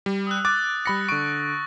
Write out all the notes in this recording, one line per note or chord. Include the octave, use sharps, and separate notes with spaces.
G3
D#6 E6 F#6
D6 F#6 A6
G3 B5 A#6 C#7
D3 C#6 D7